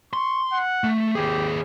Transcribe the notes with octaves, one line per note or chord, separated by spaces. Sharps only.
C6 C#6
F#5
A3
D#2 G4 G#4